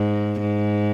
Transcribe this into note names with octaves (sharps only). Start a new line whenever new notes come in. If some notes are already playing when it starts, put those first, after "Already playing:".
Already playing: G#2
G#2